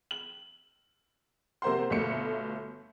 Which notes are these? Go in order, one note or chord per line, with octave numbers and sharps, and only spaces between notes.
F#7
C3 A#3 C5 F#5 C6
G1 B2 A3 C#7